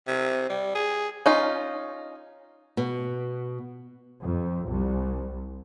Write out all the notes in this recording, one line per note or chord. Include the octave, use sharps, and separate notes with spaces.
C3
G3
G#4
C#4 D#4 F4
B2
F2
C2